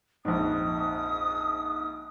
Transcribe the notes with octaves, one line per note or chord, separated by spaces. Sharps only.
A#1 F2 G#2 D#6